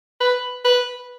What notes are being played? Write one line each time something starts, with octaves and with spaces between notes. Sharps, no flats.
B4
B4